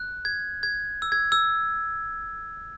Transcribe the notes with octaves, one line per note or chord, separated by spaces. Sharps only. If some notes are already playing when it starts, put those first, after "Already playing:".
Already playing: F#6
G#6
G#6
E6
G#6
E6